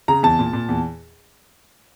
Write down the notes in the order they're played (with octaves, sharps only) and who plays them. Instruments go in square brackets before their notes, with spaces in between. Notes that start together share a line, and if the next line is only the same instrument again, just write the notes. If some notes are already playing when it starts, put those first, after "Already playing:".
[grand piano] C#3 A#5
E2 A5
A#2
A#2
E2